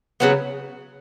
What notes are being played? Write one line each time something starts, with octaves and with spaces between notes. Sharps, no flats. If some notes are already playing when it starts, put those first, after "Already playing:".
C#3 F#3 B3